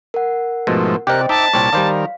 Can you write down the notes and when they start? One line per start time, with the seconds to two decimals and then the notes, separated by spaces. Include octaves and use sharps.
0.14 A#4 F#5
0.67 G#2 B2 F3 A3
1.07 C3 G4 A#4 C5 D5 D#5 G5 F#6
1.29 D#4 E5 A5 D6 B6
1.54 C2 A#2 C4 C#5 D5
1.73 D#3 G3 A#4 C5 D5 F5